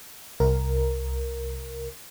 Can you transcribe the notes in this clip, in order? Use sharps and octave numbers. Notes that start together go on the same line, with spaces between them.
C2 A#4